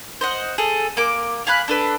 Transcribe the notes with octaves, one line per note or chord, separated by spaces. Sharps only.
C5 D#5 F#5
G#4 A4
A#3 D6
F5 G#5 B5 F#6
D4 A4 B4